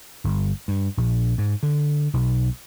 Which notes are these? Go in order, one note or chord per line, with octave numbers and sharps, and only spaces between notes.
G1
G2
A#1
G#2
D3
B1